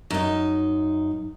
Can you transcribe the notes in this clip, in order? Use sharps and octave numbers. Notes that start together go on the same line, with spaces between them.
F#2 D#4